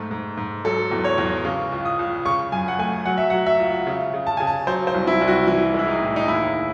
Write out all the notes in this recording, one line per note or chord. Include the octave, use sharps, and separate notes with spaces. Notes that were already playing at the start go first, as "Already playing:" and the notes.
Already playing: G#2 A3
G#2
G#2
F#3 A4
E2
C#5
E2
C#3
C#2
D#6
C#2
C#3 C#6
F#2 G#5
F#5
A3 G#5
F#3 F#5
E5
F#5
F#3
E5
C#2
C#3
C#3
A5
C#3 G#5
A5
F#3 C5
C5
C2
E4
C2
F#4
E3 E4
G#3 E4
D#4
A2
D#4
D#2 E4